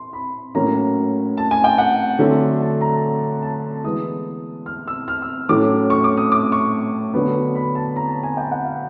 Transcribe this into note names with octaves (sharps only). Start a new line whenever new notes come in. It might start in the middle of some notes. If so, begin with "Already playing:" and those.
Already playing: C6
B5
A2 F#3 A#3 C#4 A#5
A5
G#5
G5
F#5
D3 F#3 A3 C4
A5
A#5
A5
E3 G#3 B3 D#6
F6
E6
F6
E6
A2 F#3 A3 C#4 D6
C#6
D6
D#6
D6
C#6
D3 F#3 B3
B5
A5
A#5
A5
G#5
G5
F#5
F5